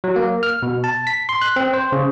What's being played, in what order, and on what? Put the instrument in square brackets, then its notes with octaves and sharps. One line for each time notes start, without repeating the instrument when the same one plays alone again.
[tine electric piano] F#3
A#3
F6
B2
A5
B6
C6
F#6
C4
C5
C#3